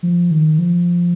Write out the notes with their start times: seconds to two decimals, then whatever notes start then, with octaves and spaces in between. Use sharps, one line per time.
0.03 F3
0.31 D#3
0.59 F3